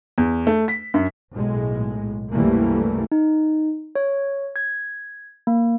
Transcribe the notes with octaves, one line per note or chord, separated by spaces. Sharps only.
E2
A3
B6
F#2
B1 A2 G#3
C2 F#2 E3 G3 A3 A#3
D#4
C#5
G#6
A#3